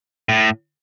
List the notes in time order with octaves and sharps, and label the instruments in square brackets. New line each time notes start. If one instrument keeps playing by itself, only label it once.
[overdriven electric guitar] A2